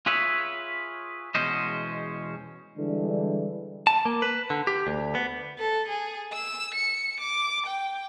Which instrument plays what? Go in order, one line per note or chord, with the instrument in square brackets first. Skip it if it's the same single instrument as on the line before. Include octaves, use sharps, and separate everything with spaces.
[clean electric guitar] F4 G#4 B4 C#5 E5
E2 B2 G#3 C#4 C5 D#5
[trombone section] D3 E3 G3 G#3 D4
[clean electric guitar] A5
A#3
B4
D3
G4
D2
B3
[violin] A4
G#4
E6
C#7
D6
G5